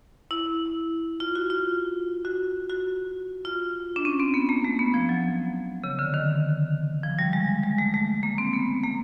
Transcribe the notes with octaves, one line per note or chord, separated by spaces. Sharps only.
E4
F4
F#4
F4
F#4
F#4
F4
D4
C#4
C4
B3
A#3
A3
B3
F3
F#3
C#3
D3
D#3
F3
G3
G#3
G#3
A3
A3
A#3
C4
B3
A#3